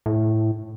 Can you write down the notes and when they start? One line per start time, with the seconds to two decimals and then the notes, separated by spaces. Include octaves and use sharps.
0.06 A2